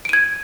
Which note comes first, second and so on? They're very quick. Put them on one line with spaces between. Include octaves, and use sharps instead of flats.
D7 D#7 G#6